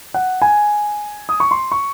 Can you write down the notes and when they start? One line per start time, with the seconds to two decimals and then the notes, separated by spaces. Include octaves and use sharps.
0.14 F#5
0.42 G#5
1.29 D#6
1.40 C#6
1.51 C6
1.72 C#6